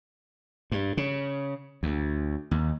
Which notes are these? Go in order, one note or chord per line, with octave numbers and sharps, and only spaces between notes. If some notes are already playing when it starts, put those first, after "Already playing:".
G2
C#3
D2
D#2